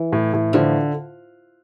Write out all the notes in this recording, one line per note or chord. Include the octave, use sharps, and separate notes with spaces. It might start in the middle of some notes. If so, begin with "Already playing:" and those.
Already playing: E3
A2
A2
D3 F3